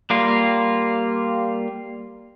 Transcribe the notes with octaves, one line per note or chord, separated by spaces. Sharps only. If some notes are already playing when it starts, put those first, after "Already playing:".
G3 A#3 F4